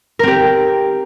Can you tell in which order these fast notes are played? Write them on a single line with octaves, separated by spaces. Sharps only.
A#4 C4 G4